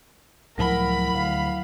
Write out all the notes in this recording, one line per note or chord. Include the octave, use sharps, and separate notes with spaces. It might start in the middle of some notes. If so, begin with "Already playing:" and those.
C#2 A2 F3 F#3 E4 A#4 F#5 B5
D2 F5